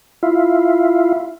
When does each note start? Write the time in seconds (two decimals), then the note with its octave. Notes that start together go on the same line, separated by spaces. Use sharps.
0.23 E4 F4